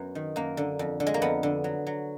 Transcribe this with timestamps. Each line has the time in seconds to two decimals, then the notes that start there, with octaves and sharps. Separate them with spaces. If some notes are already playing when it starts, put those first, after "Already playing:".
Already playing: F#2 F#3 B3
0.15 D#3
0.36 F#2 A#3
0.57 D3
0.79 F2
1.00 D3
1.07 G#3
1.14 A#3
1.22 F2 B3
1.43 D3
1.64 F#3
1.87 F#3